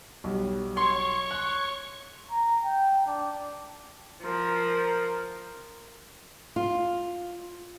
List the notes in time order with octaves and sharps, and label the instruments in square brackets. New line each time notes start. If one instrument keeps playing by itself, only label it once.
[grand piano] B1 G3
[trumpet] C#5 [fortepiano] C6 [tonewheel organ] C#6
[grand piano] F#6
[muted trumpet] A#5
G5
D4
[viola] F3 A#4
[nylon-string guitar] F4